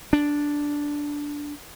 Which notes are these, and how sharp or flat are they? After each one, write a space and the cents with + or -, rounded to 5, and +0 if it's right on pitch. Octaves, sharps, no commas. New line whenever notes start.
D4 -5